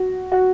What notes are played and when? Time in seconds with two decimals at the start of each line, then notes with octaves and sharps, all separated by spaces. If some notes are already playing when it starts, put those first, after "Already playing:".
Already playing: F#4
0.32 F#4